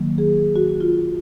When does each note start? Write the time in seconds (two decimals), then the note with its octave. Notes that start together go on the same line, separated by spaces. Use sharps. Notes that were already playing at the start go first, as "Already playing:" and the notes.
Already playing: D#3 F#3 A#3
0.18 G#4
0.56 F#4
0.81 F4